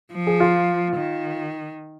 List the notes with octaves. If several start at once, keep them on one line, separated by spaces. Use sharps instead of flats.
F3
G#4
F4
D#3